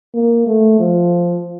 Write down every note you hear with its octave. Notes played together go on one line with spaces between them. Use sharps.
A#3
A3
F3